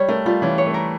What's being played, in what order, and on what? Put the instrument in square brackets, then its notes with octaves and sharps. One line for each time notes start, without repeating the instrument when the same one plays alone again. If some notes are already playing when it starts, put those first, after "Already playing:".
Already playing: [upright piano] G3 [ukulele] C#5
[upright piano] A3 [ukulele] A#4
[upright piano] G3 [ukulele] F4
[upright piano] E3 [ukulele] C#4
[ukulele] C#5
[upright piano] A3
[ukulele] A#4